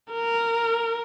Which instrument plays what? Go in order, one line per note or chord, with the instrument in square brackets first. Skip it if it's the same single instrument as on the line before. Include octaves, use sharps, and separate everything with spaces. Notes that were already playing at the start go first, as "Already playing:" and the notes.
[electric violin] A#4